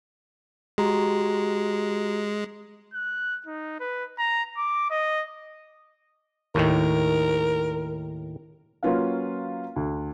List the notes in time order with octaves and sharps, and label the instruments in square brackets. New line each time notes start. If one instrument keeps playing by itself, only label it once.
[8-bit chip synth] G#3 [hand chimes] F#4 G4 A#5
[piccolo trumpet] F#6
D#4
B4
A#5
D6
D#5
[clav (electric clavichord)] D#2 A2 D#3 [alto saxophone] A#4
[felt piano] F#3 A#3 C#4 F4 B4 F5
D2